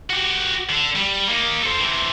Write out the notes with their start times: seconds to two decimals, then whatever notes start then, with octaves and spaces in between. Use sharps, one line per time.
0.10 F#4 G4
0.69 D3
0.95 G3
1.29 A#3 D#4
1.63 A4 C5
1.80 E3 C4